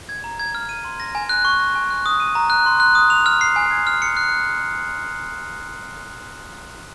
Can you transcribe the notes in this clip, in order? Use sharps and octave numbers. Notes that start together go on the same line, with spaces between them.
G#6
A#5
G#6
F6
D#7
C6
A#6
G#5
F#6
C#6
A#6
G#5
F#6
D#6
D#7
A#5
F#6
C6
F#6
D#6
F7
F6
C7
G#5
G#6
F6
C#7
F#6